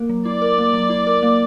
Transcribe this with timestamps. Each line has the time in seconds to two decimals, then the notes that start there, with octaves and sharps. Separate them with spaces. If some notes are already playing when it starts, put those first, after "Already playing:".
Already playing: A#3 A#4
0.09 F#3
0.25 E4 D5
0.42 A#4
0.58 A#3
0.74 F#3
0.90 E4
1.07 A#4
1.23 A#3